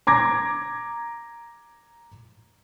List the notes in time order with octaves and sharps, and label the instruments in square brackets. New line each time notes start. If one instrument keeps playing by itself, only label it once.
[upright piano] A#5 D6 G#6 A#6